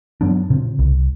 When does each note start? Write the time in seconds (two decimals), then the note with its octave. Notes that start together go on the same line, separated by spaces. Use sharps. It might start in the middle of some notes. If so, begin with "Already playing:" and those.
0.21 G2 F#3 B3 D4
0.50 A#2 C#3 C4
0.79 C2